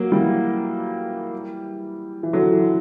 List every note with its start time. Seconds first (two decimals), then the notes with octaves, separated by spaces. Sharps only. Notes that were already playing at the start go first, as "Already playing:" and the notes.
Already playing: F#3 A#3
0.12 E3 G3
2.23 E3
2.33 D3 F#3
2.52 E3